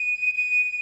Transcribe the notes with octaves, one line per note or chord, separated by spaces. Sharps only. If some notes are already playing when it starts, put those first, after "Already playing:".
Already playing: D#7
D#7